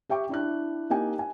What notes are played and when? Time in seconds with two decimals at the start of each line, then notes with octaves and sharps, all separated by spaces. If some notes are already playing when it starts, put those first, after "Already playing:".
0.09 G4 E5 G5 C#6 D6
0.29 D4 E4 F#6
0.90 A#3 D#4 G4 G5 G#5
1.19 G#5